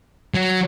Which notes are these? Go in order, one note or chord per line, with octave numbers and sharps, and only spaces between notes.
F#3